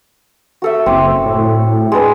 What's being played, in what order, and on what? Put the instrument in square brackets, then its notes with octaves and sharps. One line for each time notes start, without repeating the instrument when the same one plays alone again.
[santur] F#4 A4 E5
[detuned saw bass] F#1 [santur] C4 D6
[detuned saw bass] A2
[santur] G#3 D4 B4